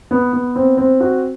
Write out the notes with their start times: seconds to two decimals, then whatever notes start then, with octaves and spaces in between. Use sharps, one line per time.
0.11 B3
0.33 B3
0.55 C4
0.77 C4
1.00 F#4